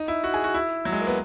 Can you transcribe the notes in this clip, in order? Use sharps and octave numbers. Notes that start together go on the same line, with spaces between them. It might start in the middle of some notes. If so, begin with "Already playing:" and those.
Already playing: D#4
E4
F#4
G#4
F#4
E4
F#3
G#3
A#3
B3